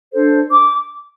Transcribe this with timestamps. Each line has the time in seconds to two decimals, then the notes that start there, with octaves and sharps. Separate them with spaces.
0.13 D4 A4 C5
0.51 D6